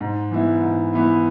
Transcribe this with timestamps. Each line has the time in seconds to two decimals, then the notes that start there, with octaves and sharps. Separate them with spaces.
0.01 G#2
0.31 E3 B3 E4
0.62 G#2
0.93 E3 B3 E4